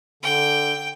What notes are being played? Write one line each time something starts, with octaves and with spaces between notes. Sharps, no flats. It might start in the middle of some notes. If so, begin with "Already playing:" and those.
D3 G5